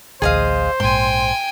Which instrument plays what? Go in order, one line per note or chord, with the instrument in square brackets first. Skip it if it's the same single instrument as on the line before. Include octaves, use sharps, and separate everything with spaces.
[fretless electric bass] A1 D2 [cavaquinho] G#4 D#5 F5 [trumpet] C5
[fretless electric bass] A#1 G#2 [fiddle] G5 G#5 [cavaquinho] C6